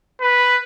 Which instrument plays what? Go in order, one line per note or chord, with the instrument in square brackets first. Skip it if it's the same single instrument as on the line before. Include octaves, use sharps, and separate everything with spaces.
[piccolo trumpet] B4